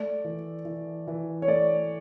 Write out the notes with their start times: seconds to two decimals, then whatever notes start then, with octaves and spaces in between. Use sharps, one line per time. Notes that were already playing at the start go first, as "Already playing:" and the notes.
Already playing: A3 D5
0.24 E3
0.65 E3
1.07 E3
1.42 C#5
1.48 A3 D5